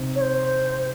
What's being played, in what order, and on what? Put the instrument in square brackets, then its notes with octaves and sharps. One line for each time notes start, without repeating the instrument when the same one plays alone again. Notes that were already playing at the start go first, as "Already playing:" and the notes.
Already playing: [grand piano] C3 C4 D#4
[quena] C#5
C5